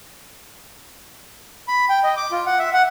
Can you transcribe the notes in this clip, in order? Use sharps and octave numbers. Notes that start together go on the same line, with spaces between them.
B5
G5
D#5
D6
F4
F#5
E5
F#5